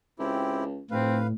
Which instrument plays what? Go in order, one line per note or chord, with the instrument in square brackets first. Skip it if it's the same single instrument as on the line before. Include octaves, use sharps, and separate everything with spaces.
[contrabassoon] C#2 [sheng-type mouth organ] C4 E4 G4
[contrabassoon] F1 [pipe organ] A2 [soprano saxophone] C4 [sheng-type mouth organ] B4 F5